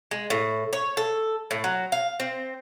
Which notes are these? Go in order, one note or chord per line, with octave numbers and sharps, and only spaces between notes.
G#3
A2
C#5
A4
A2
F#3
F5
C4